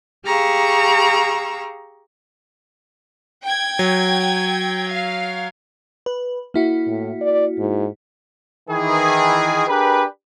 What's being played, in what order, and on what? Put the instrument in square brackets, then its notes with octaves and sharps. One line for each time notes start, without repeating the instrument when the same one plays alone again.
[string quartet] G4 G#4 F5 A#5 C#6 E6
[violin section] G5 G#6
[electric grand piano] F#3
[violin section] F5
[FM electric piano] B4
A#3 E4 F#4
[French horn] A2
D5
G#2
[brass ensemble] D#3 E3 G#4
D4 G4 G#4 A#4 B4